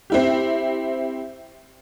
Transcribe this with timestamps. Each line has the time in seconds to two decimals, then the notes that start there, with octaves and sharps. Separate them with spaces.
0.10 C4 E4 G4